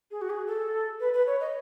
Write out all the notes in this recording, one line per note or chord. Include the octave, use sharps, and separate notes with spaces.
G#4
F#4
G#4
A4
B4
B4
C#5
D#5